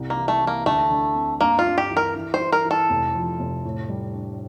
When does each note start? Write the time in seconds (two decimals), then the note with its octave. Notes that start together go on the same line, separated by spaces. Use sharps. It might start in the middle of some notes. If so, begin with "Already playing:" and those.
Already playing: C2
0.10 A#3
0.16 E3
0.28 A3
0.42 E3
0.47 A#3
0.66 D2 A3
0.91 D3
1.15 C4
1.41 G2 A#3
1.59 F4
1.65 G2
1.78 G4
1.90 E3
1.97 A#4
2.15 E3
2.34 C5
2.40 E3
2.52 A#4
2.65 E3
2.71 A4
2.90 F1
3.15 F3
3.39 F1
3.65 A2
3.89 G3
4.14 D4